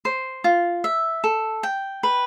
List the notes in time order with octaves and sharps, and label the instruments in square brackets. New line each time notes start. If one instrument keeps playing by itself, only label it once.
[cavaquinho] C5
F4
E5
A4
G5
B4